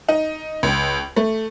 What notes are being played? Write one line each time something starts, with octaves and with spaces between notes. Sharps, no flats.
D#4
C#2
A3